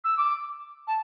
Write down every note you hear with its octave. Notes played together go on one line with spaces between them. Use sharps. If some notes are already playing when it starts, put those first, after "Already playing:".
E6
D6
A5